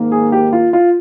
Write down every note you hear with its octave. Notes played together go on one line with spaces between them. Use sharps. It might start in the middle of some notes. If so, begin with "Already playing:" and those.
Already playing: G#2 D#3 A#3
G#4
G4
F4
F4